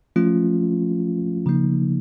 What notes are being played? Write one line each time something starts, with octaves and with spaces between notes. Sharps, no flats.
F3 A3 C#4 F4
C#3 F3 A#3 D#4